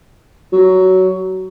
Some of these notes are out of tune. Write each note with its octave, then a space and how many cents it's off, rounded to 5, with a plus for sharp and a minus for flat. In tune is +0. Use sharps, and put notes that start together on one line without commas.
F#3 +15